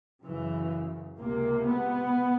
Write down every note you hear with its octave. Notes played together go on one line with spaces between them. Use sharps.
F#2 C#3 E3
C#2 C3 A#3
B3